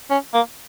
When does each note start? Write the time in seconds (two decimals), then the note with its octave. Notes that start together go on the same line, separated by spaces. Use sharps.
0.10 C#4
0.34 A#3